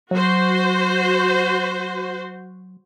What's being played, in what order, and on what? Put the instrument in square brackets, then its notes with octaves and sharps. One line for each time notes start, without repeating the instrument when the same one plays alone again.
[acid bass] F#3 [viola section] F#4 C5